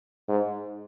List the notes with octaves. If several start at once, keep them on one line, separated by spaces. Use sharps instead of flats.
G#2